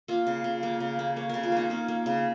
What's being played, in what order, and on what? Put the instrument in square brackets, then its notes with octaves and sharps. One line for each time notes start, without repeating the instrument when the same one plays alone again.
[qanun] A#3 F4
C#3
C#3
A#3 A#4
C#3
A#3
A#3 C#5
C#3 A#4
F4
A#3 D#4
A#3 C#4
A#3
C#3